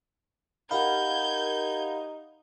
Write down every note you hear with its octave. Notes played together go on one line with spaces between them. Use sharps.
D#4 G4 A#4 F5 F#5 B5 G6 G#6